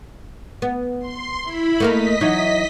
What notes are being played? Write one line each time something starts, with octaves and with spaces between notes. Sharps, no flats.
B3
C6
E4 B5
A3 A#3 A#4 D#5 B6
E3 F#3 D#4